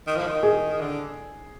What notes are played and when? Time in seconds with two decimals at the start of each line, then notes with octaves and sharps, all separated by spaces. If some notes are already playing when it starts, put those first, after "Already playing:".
0.07 D#3
0.16 F3
0.26 D#3
0.43 G#4
0.80 D3